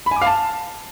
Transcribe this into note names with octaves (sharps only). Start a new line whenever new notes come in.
B5
G#5
D6
F5
A5